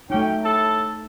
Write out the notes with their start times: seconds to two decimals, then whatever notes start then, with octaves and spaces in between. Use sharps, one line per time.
0.10 F#3 A3 C#4 D#4 G5
0.44 A2 A4 A5